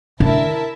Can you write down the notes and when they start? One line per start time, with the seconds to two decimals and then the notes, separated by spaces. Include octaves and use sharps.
0.20 D3 E4 A#4 E5 A5